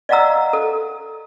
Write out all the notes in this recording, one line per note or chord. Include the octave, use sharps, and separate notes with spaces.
D5 D#5 F5 F#5 A#5 E6
A4